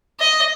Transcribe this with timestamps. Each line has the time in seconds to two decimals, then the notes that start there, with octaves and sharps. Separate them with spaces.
0.20 D#5